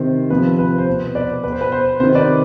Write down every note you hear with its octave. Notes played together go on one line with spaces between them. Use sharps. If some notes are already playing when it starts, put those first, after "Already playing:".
Already playing: C3 D#3 C5
C3 F3 B4
B4
C5
B2
B4 D5
B2 B4
C5
B4
C5
C3 D#3 C5
B4 D5